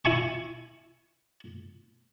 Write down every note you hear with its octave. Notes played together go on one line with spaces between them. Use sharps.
E4 G#5 C#6